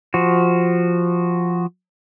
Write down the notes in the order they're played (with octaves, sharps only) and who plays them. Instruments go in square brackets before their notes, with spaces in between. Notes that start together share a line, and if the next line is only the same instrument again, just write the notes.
[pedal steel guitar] F3 F#4